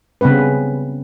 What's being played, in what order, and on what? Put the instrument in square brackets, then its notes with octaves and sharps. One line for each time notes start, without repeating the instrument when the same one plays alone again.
[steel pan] C#3 G3 B3 C4 B4